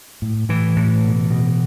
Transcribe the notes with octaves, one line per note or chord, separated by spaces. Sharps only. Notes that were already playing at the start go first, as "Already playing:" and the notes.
A2
A2 E3
A2
B2
B2